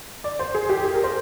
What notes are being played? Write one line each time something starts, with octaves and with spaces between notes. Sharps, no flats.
D5
C5
G#4
G4
G#4
A#4
C5